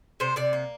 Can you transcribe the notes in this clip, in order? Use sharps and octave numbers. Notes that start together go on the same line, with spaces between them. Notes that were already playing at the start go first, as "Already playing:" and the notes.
C3 C5
C3 D5
A#3